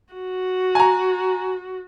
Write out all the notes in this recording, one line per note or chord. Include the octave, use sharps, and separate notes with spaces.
F#4
G#5 A#5